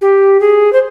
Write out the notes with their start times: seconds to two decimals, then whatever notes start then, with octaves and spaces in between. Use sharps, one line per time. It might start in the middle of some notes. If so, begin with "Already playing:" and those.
0.01 G4
0.40 G#4
0.73 C5